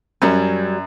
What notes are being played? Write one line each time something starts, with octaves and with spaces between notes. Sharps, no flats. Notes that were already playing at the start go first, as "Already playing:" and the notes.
F#2 F#3 G3 C#4